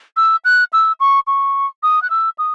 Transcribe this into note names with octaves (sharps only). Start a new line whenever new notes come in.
E6
F#6
E6
C#6
C#6
D#6
F#6
E6
D#6